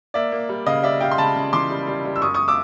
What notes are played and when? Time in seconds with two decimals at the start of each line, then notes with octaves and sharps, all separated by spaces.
0.14 A#3 D5 E5
0.32 A#3
0.49 G3
0.66 C#3 D#5 F5
0.83 G3 D5 E5
1.00 G3 F5 G5
1.11 C6
1.18 C#3 A5 B5
1.36 C#3
1.53 E3 C6 D6
1.70 G3
1.87 G3
2.05 G3
2.16 E6
2.22 F#2 C#6 D#6
2.34 C#6 D#6
2.48 D6 E6